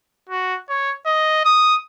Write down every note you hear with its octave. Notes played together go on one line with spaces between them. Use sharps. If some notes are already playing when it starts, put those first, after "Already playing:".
F#4
C#5
D#5
D#6